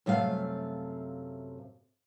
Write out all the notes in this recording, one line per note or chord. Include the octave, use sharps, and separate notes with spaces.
F#2 C3 A3 F5